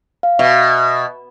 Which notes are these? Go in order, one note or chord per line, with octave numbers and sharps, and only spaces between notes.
F5
B2 E5